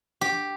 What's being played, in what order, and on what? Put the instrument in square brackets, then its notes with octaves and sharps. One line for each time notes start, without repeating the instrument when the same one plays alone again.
[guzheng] G4